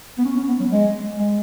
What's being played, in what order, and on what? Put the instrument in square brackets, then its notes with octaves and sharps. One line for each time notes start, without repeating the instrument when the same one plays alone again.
[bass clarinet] B3
C#4
C#4
B3
F#3
G#3
G#3